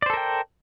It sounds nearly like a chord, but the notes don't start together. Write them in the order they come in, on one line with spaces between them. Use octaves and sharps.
D5 C5 A4 A#4 G5